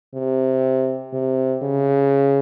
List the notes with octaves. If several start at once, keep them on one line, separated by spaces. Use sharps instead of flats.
C3
C3
C#3